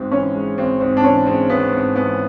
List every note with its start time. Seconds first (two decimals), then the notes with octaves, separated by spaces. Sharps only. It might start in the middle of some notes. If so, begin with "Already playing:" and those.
Already playing: G#1 G#2 C4
0.12 E3 C#4
0.35 G#3
0.58 G#1 C4
0.80 G#2 C4
0.97 D4
1.03 E3 C#4
1.26 G#3 C4
1.50 G#1 B3
1.72 G#2 C4
1.95 E3 B3